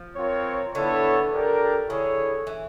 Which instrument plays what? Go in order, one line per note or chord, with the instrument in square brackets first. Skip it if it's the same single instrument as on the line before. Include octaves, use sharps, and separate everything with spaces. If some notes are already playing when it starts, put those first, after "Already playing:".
Already playing: [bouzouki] F3
[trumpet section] C4 F4 A#4 C#5
[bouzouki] D3 [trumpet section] B3 E4 A4 C#5
[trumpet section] D4 G4 A#4 D5
[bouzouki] D3 [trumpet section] E4 G#4 C#5
[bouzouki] E3